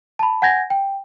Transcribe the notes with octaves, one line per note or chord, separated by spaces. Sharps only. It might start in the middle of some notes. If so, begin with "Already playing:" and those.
A5 B5
F#5 G#5 G6 G#6 A#6
G5